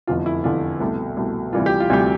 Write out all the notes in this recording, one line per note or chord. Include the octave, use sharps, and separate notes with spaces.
F1 E2 D3 F3 F4
E4
F1 E2 D3 F3 F4
C2 B2 A3
C2 B2 A3
D2 C3 E3 G3 F4
G4
F4
D2 C3 E3 G3 G4